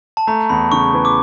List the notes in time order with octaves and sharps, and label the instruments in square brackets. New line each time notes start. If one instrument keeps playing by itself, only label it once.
[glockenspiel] A5
[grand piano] A3 [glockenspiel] A#5
[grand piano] E2 [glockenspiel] B5
[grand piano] C#3 [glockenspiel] C#6
[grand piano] E3
[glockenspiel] D6